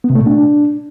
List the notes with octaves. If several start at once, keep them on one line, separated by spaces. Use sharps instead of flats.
B3
C3
A3
A#2
D4